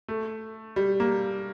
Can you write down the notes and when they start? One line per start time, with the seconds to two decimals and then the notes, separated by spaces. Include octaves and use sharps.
0.08 A3
0.76 G3
1.00 A#3